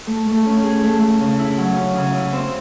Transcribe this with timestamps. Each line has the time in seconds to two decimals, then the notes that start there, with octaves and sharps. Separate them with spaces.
0.07 A3
0.27 A3
0.46 C#4
0.64 G#4
0.83 A3
1.01 A3
1.20 C#3
1.39 E4
1.58 F#3
1.76 C#4
1.96 C#3
2.14 E4
2.33 C4